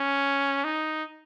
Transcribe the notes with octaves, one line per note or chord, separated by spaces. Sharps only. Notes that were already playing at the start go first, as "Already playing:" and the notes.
Already playing: C#4
D#4